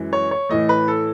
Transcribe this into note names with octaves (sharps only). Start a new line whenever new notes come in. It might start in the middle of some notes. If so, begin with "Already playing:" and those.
Already playing: F#2 E3 G#3
C#5
C#5
A2 E3 A3 D#5
B4
A4